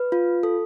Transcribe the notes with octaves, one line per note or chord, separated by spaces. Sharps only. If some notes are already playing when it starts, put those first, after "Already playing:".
Already playing: B4
F4
A4